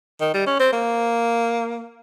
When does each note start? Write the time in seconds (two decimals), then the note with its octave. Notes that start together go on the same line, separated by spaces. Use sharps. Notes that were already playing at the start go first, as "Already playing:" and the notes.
0.21 D#3
0.34 G3
0.47 C#4
0.60 C4
0.72 A#3